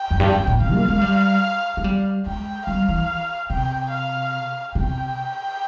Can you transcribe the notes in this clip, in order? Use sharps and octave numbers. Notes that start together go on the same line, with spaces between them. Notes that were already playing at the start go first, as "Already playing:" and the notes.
Already playing: G5
F2
G2
F2
A#2
C3 F5
A#3
G#3
G3
G#3
G3
G#3 G5
G3 F5
E3
C3 G5
F5
C3 G5